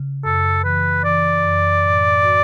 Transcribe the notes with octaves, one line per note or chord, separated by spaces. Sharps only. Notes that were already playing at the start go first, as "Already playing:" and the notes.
Already playing: C#3
F#2 A4
E3 B4
E3 D5
F#2
A2
F#4